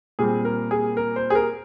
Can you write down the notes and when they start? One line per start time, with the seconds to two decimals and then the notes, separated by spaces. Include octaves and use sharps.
0.19 A#2 G3 C4 G#4
0.45 A#4
0.71 G#4
0.97 A#4
1.16 C5
1.30 G#4
1.35 A#4